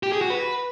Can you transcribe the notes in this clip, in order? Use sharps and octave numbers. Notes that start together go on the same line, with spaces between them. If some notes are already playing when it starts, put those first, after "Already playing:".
G4
G#4
F#4
B4